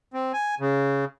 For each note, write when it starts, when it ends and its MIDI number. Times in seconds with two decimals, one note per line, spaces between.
0.14 0.32 60
0.33 0.55 80
0.60 1.05 49